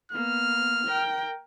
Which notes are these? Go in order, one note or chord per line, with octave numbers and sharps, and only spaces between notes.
A#3 B3 F6
A#4 G5